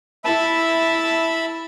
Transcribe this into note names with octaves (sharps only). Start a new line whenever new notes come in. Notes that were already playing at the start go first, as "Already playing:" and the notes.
E4 E5 A5 B5